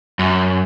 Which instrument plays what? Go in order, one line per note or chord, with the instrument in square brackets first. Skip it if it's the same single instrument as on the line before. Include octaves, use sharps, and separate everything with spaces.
[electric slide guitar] F#2